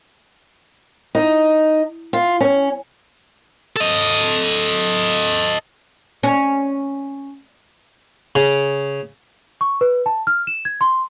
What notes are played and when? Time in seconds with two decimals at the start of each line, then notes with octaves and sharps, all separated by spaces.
1.15 D#4
2.13 F4
2.40 C#4
3.76 A4 D#5
6.23 C#4
8.35 C#3
9.61 C#6
9.81 B4
10.06 A5
10.27 F6
10.47 E7
10.65 G#6
10.81 C6